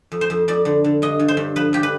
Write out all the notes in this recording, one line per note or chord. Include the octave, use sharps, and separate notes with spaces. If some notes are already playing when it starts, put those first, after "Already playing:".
F2
C5
F2
F2 D5
D3
D3
G2 D#5
G2
C5
G2
F3 B4
G2 G4
B4